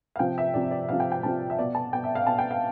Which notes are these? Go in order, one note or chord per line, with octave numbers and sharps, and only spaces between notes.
F5
C3 F3 G5
E5
C3 F3 D5
D5
C3 F3 F5
G5
G5
C3 F3 A5
E5
B2 D5
A5
B2 G5
E5
F5
B2 A5
G5
F5